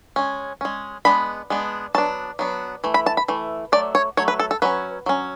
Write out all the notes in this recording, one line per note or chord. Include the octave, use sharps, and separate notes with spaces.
G#3 C#4
G#3 C#4
G#3 B3 D4 B5
G#3 B3 D4
F#3 B3 D4 A5
F#3 B3 D4
E3 A3
B5
A5
B5
E3 A3
F#3 A3 D5
C#5
F#3 A3 C#5
B4
A4
A4
F#3 C#4 B4
F#3 C#4